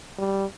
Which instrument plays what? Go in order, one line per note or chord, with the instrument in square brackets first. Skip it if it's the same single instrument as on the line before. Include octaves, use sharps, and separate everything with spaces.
[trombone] G3